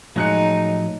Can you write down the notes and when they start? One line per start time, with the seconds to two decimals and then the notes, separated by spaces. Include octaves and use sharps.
0.16 A2 F3 F#3 G#3 D#4 F#6 C#7